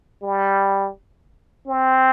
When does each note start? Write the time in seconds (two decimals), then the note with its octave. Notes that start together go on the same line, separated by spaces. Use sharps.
0.22 G3
1.67 C4